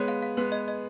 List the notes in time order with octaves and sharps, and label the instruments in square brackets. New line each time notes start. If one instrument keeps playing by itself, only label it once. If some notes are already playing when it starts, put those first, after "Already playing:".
Already playing: [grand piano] G#3 B3 [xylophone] C#5
[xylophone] F5
F5
[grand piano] G#3 B3 [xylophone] B4
[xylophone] D#5
D#5